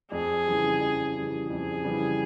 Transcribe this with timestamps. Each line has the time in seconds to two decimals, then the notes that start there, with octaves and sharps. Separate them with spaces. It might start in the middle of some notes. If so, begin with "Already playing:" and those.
0.12 F2 G#4
0.46 C#3 E3 G3
0.81 F2
1.15 C#3 E3 G3
1.50 F2 G#4
1.84 C#3 E3 G3